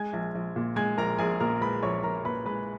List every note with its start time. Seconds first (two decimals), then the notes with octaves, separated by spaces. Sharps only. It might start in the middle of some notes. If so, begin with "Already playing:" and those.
Already playing: G#3 G#5 G#6
0.13 A#1
0.35 A#1
0.56 A#2
0.76 G#3 G#5 G#6
0.98 A#1 A#4 A#5
1.18 A#1 G#4 G#5
1.40 A#2 A#4 A#5
1.61 G#3 B4 B5
1.83 A#1 C#5 C#6
2.03 A#1 A#4 A#5
2.25 A#2 B4 B5
2.45 G#3 B4 B5